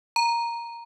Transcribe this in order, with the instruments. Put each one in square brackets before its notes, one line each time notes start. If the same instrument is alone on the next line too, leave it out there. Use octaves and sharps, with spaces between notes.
[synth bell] A#5